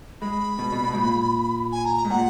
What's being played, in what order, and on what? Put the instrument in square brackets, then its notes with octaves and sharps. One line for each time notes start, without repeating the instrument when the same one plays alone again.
[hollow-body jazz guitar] G#3 [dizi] B5
[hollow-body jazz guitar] B2
B2
B2
G#2
A#2
[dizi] G#5
A#5
A#5
[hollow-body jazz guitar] G#2
[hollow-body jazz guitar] A#2 [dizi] F#5